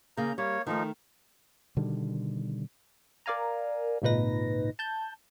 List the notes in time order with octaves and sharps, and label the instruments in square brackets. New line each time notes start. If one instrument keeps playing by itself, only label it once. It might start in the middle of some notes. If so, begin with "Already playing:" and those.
[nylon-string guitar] C#3 A#3 [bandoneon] A#5 G6
[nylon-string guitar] G3 [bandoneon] A#3 C#5
[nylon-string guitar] D#3 A3 [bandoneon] F3 D#4
[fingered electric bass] B2 D3 D#3 G3
[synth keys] A#4 D5 F5 G#5 A#5
G#1 C#2 A#2 D#4 B4 A#6
A5 G6